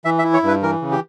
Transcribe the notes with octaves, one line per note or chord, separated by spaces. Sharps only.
E3 E5
E5
E4
C#5
G2 B4
E3 A#4
C#3
G4